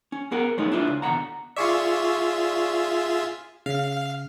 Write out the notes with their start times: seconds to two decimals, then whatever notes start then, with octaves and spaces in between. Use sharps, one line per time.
0.12 C#4
0.32 B3 G#4 A#4 F#5
0.58 F#3 G#3 A3 B3 C#4 D#4
0.72 D4 E4 F4 G4 B4
0.88 C#2
1.02 E2 B2 D3 F#5 A#5
1.57 F4 G#4 D5 E5 C#6
3.66 C#3 F5